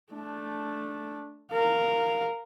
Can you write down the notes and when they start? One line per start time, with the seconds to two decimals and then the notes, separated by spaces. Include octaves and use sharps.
0.13 A3 D4
1.52 A#4 F5